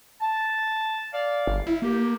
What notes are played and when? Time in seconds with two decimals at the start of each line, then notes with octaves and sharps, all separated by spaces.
0.21 A5
1.13 D5 F5
1.47 G1
1.67 E4
1.82 A#3 G4